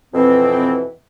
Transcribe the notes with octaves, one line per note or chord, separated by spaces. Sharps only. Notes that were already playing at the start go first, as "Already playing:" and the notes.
F2 B2 E3 C4